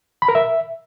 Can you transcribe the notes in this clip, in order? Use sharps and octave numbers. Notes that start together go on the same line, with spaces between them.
B5
A#4
E5